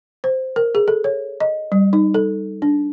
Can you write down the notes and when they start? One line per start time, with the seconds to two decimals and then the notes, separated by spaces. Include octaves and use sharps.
0.24 C5
0.56 A#4
0.75 G#4
0.88 A4
1.04 C#5
1.40 D#5
1.72 G3
1.93 D#4
2.14 A4
2.62 D4